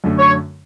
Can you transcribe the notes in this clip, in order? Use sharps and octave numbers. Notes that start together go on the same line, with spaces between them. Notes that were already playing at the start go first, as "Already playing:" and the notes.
F#2 D3 A3
C#5